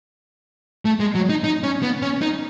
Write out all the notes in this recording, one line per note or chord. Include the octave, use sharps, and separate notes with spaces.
A3
G#3
F#3
D#4
D#4
C#4
B3
C#4
D#4